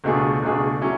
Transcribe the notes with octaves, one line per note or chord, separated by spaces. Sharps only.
C#2 B2 A3 D4 G#4
C#2 B2 A3 D4 G#4
F#3 C#4 E4